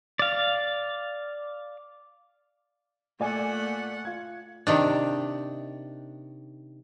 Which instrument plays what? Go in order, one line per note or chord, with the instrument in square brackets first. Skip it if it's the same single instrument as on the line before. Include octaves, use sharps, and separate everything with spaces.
[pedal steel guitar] D5 F5
[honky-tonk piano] A#2 D5 G#5 [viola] A3 F#5
[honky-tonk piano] F4 G#6
[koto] C3 D#3 D4